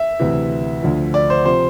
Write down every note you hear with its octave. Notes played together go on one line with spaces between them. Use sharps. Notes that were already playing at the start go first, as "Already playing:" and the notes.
Already playing: E5
D2 C3 E3
D2 D3 F3
D5
C5
C3 F3 C5